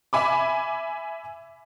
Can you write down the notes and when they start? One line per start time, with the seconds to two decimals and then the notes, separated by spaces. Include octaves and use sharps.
0.13 E5 G#5 B5 D6